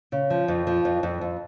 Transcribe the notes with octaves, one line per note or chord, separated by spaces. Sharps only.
C#3
F3
F2
F3
F2
F2
F2